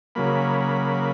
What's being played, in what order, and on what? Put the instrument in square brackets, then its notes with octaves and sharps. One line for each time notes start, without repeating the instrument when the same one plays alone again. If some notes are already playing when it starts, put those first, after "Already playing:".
[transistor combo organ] C#3 F#3 A#3 B5
B5